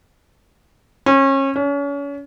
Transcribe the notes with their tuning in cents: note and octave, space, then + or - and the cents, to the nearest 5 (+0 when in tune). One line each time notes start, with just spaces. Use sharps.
C#4 -30
C#4 +35